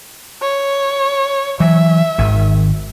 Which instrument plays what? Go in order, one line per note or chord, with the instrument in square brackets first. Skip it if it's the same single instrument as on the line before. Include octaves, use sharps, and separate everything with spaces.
[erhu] C#5
[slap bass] E3 F#3 [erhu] E5
[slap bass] G#1 D#3